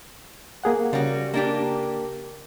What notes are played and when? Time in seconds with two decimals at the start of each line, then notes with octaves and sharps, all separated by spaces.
0.64 A#3 G#4 F#5
0.93 C#3 G3 F#4
1.34 A#3 D4 G4